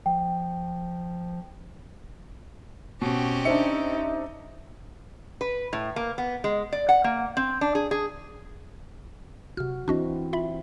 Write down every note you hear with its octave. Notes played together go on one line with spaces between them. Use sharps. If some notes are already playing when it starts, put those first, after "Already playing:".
F3 G5
B2 C4 C#4 G4
D4 D#4 C5 E5 C#7
B4
A2
A#3
B3
G#3
D5
F#5
A#3
C4
D4
G#4
G#4
C3 F#4 F6
E3 C4 D4 E4 F#4 D#5
F4 E5 B5